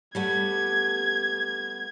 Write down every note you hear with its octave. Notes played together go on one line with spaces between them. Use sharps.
G3 A3 B3 G#6